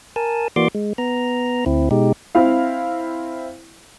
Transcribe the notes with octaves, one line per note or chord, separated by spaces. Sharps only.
A#4 G#5 A5
E3 A#3 F#4 D5 C6 D6
G#3
B3 A#5
D2 C4 E4
B2 G#3 D#4 G4
C4 E4 F5